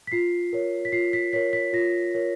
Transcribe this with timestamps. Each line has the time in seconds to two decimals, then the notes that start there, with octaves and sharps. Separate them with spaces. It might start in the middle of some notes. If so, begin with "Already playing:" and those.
0.07 B6
0.12 F4 C7
0.53 A#4 C#5
0.85 B6
0.92 F4 C7
1.13 B6
1.33 A#4 C#5 B6
1.53 B6
1.73 F4 A#6
2.14 A#4 C#5